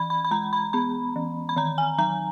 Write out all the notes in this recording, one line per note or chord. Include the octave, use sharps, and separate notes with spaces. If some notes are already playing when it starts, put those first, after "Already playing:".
Already playing: E3 B5
B5
B5
G#3 A#5
B5
B3 B5
E3
B5
D#3 A#5
G#5
F#3 A#5